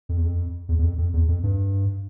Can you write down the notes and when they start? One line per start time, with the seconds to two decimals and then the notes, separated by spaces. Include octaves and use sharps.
0.09 F2
0.17 E2
0.26 F2
0.69 E2
0.79 E2
0.84 F2
0.98 F2
1.14 E2
1.29 F2
1.43 G2